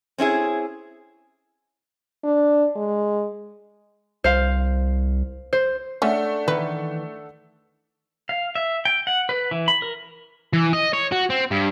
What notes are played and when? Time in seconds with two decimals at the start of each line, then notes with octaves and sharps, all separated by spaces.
0.18 C4 C#4 E4 G#4
2.24 D4
2.76 G#3
4.24 C2 C5 F5
5.53 C5
6.02 A3 C#4 D4 A4 F#5
6.48 D#3 E3 B4
8.29 F5
8.55 E5
8.85 G5
9.07 F#5
9.29 B4
9.51 E3
9.68 B5
9.82 A#4
10.53 E3
10.73 D#5
10.93 C#5
11.12 F#4
11.30 C4
11.51 G2